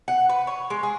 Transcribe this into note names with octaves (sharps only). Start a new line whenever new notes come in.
F#5
B4
C#5
G#3
G#4